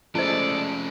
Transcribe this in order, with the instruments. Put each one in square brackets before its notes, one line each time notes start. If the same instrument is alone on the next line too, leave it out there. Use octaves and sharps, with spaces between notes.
[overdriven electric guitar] F3 A3 [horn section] G#3 A4 [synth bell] C#4 C5 [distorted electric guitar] D5